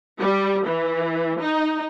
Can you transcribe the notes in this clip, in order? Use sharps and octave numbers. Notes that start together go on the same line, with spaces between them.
G3
E3
D#4